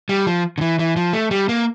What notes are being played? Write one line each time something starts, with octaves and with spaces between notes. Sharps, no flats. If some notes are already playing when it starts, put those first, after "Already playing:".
G3
F3
D3
E3
E3
F3
A3
G3
A#3